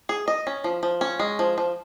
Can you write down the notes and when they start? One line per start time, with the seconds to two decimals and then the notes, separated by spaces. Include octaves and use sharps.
0.09 G#4
0.28 D#5
0.47 C#4
0.64 F3
0.83 F3
1.01 C#4
1.19 G#3
1.39 F3
1.58 F3